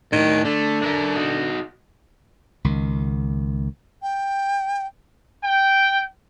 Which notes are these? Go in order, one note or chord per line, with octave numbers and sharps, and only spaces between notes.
A2 D#3 D4
D3 A3
D4 A#4 E5
D#4 F#4
C#2 D#3
G5
G5